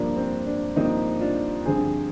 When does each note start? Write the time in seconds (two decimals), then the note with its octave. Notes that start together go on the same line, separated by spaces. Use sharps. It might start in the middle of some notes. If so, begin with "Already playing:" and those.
Already playing: G2 F3 A#3 D4
0.16 C4
0.46 D4
0.76 G2 F3 A#3 C4 D#4
1.21 D4 F4
1.65 G2 D3 F3 C4 G#4 C5